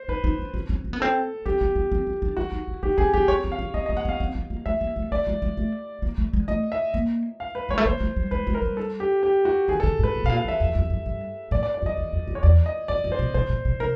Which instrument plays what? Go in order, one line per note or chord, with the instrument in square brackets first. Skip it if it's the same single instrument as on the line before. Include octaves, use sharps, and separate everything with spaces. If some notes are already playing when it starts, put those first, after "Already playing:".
Already playing: [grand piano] C5
[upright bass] D#4 [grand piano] B4
[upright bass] D#4
D4
C#4
C#4
C4
B3
[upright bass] C4 [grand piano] A4
[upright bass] C4 [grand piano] G4
[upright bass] B3
B3
C4
C#4
D4
[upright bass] E4 [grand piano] F#4
[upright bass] D#4
E4
[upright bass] D#4 [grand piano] G4
[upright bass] C#4 [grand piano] G#4
[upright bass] B3 [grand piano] G4
[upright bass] C4 [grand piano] C#5
[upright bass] C4
[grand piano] F5
[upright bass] C#4
[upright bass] C4 [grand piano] D#5
[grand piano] D#5
[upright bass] A#3
[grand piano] F#5
[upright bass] B3
[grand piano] F5
[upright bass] C4
B3
A#3
[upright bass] A3 [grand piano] E5
[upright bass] A#3
A3
[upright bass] A3 [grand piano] D5
[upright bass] G#3
G#3
A3
A#3
A3
G#3
[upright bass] A3 [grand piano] D#5
[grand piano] E5
[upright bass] A#3
[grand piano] F5
B4
[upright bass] G#3 [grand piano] C#5
[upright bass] A3
[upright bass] A#3 [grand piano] C5
[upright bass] A3
G3
[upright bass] G#3 [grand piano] B4
[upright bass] G#3
[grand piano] A#4
[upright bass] G3
[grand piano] A4
G4
G4
F#4
[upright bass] D#3 [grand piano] G#4
[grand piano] A4
[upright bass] D3
G#2
[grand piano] B4
[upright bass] A2
[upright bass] B2 [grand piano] F5
[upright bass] A#2
[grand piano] F5
[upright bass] E2
[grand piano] E5
[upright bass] F2
F2
F#2
G2
[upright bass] A2 [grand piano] D5
[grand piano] D5
D5
[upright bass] F#2
[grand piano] D#5
[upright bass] E2
F2
F2
[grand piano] C#5
[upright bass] E2 [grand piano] D5
[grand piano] D#5
[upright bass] F2 [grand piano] D5
[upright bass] F#2
[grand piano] C5
[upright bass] B2
[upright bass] B2 [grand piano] C5
[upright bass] A#2
B2
[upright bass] C3 [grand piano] A#4